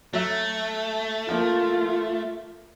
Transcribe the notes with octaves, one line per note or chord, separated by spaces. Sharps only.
F#3 A3 E5
F3 A#3 F4